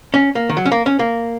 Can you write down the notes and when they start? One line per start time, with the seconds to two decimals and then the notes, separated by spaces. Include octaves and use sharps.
0.14 C#4
0.35 A#3
0.49 D#3
0.57 F#3
0.65 C#4
0.72 A#3
0.86 C#4
0.99 A#3